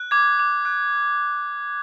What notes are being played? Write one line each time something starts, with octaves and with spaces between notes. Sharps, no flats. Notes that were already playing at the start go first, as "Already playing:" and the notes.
Already playing: F#6
D6 G#6
D6
F#6